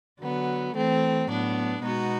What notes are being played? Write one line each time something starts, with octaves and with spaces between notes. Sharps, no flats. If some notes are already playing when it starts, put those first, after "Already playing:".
D3 F#3 B3
E3 A3 C4
A2 F#3 B3 D4
B2 G#3 B3 D#4 F#4